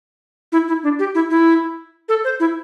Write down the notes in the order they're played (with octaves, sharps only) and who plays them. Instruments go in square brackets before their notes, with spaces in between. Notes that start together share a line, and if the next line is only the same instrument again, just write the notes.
[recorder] E4
E4
D4
G4
E4
E4
A4
C5
E4